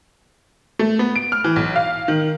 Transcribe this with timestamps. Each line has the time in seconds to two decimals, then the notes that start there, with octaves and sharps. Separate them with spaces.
0.79 A3
0.99 B3
1.16 D7
1.32 F6
1.44 E3
1.56 B1
1.76 F5
2.08 D#3